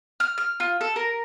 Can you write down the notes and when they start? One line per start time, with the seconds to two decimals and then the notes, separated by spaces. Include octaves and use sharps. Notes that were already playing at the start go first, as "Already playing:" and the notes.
0.20 F6
0.38 F6
0.60 F4
0.81 A4
0.96 A#4